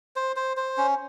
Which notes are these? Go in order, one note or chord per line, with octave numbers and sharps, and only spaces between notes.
C5
C5
C5
C#4